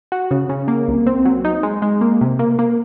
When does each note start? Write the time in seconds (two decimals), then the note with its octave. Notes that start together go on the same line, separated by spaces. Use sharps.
0.12 F#4
0.31 C#3
0.49 C#3
0.68 A#3
0.88 C2
1.07 C4
1.25 F#3
1.45 D#4
1.63 G#3
1.82 G#3
2.01 A#3
2.21 C3
2.39 A#3
2.59 A#3